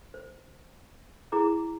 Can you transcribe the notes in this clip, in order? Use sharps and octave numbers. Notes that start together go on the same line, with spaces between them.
C5
E4 G#4 A#5 D6